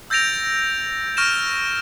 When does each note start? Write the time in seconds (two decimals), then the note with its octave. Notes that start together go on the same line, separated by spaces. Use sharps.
0.10 E6 G6 A6 A#6 D7 F7
1.17 C#6 F6 A#6 D7 E7